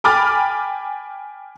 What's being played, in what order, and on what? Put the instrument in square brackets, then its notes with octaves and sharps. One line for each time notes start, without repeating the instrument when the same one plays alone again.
[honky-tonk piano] G5 G#5 B5 D6 F6 A6